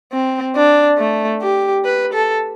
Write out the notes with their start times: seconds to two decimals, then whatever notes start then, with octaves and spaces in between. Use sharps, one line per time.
0.12 C4
0.55 D4
0.98 A3
1.41 G4
1.85 B4
2.13 A4